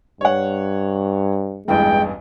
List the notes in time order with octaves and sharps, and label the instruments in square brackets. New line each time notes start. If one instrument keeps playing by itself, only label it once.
[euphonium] G2 [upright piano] C#5 F#5
[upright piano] A1 E2 G2 [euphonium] G#3 [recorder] G5